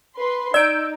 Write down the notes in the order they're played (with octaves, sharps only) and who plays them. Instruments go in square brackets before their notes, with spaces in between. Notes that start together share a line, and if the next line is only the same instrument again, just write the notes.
[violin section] B4 C6
[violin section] D#4 [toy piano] D5 [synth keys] E6 G6 D7